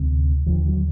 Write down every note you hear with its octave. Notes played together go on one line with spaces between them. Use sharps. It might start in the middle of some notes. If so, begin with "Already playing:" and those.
Already playing: D2 C3
D#2 D3 F3
F#3